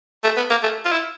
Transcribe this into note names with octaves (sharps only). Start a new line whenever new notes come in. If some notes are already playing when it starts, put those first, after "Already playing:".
A3
B3
A#3
A3
F4
E4